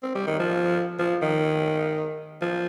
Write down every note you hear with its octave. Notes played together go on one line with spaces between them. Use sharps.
C4
G3
D#3
F3
F3
D#3
F3